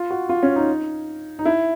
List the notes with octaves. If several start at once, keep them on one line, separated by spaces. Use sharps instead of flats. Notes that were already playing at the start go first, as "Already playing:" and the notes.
Already playing: F4
F#4
F4
C#4
D#4
D#4
E4